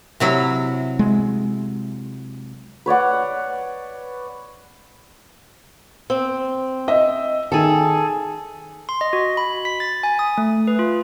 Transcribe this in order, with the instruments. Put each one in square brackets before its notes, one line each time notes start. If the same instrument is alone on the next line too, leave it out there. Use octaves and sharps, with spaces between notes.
[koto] C3 F#3 E4
[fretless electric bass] G#3
[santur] B4 C#5 D5 F#5
[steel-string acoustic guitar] C4
[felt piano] D#5 E5
[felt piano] D#3 [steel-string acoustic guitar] G#4 A4
[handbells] C6
D#5
F#4
B5
B6
A6
G#5
D#6
A3
B4
F4